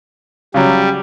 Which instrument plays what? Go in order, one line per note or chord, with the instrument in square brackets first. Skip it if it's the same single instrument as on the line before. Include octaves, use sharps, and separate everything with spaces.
[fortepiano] C#3 F#3 [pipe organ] G3